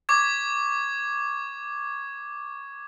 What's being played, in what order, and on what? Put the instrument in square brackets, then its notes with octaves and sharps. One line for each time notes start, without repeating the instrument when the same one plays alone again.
[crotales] C#6 D6 G#6